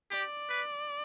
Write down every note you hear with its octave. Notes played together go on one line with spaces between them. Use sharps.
G4 D5
B4